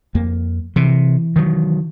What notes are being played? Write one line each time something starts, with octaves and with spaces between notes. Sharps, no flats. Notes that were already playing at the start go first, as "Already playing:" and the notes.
F2 A#3
C3 E3
D#3 F#3